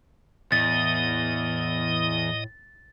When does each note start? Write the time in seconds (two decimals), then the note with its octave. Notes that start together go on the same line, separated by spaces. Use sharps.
0.52 E2 A2 D#5 D#6 A6